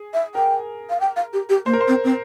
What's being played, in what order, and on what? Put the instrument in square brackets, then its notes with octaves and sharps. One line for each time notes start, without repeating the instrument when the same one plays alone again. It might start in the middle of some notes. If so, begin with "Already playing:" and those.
Already playing: [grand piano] G#4
[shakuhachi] E5
[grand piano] A#4 [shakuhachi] G5
[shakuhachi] F5
G5
F5
G4
G4
[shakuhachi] A#3 [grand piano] C5
[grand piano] A#4
C5
[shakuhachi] C4
C4